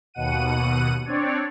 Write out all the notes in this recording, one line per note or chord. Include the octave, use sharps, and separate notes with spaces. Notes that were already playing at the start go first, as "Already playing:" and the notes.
D#2 B2 F#5 D#7
C4 D4 C#5 D5